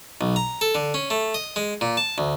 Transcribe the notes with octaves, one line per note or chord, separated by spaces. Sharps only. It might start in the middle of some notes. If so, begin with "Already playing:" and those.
B1
A#5
A4
D3
C#4
A3
D#5
G#3
A#2
A5
D2